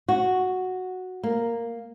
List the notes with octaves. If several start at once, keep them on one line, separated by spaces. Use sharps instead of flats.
F#4
A#3